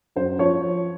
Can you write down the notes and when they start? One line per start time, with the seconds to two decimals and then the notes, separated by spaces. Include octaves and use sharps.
0.16 F#2 C5
0.39 F3 C#5